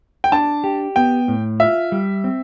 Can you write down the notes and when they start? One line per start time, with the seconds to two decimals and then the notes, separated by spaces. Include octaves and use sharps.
0.24 G5
0.32 D4 A5
0.64 G4
0.96 B3 G5
1.28 A2
1.60 F4 E5
1.92 G3
2.24 C4